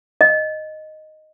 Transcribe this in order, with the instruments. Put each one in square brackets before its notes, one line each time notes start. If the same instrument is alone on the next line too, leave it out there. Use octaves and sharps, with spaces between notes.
[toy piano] D#5